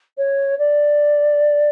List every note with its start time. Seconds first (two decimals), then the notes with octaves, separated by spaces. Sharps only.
0.17 C#5
0.58 D5